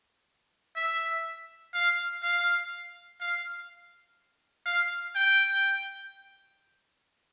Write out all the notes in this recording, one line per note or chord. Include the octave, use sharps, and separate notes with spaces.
E5
F5
F5
F5
F5
G5